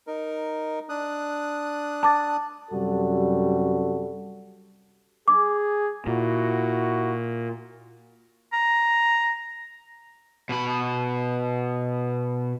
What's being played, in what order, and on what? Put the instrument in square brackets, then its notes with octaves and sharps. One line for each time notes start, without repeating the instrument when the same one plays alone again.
[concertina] D#4 A#4
D4 D#6 F#6
[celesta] A5 D6 A6
[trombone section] F#2 C3 G3 F#4 A4
[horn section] G#4 [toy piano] D6
[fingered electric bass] A#2 [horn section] E4 F#4
[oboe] A#5
[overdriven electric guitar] B2 B5